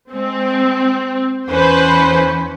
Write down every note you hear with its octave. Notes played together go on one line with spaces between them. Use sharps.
G#3 C4
E2 C#4 B4 C5